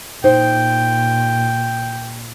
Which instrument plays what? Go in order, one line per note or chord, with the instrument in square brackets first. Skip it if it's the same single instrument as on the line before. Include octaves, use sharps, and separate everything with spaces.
[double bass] A#2 [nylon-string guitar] D#4 C5 [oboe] G5